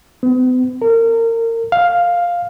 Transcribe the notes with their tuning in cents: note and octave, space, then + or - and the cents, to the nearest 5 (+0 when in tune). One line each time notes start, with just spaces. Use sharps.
B3 +45
A#4 -30
F5 +5